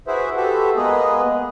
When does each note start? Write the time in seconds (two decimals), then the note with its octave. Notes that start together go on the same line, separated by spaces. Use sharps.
0.07 E4 F#4 G#4 B4 C5 E5
0.36 F#4 G4 A4 B4 C5 E5
0.76 G#3 A#3 B3 G#4 B4 D#5